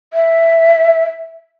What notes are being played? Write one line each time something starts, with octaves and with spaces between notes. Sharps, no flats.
E5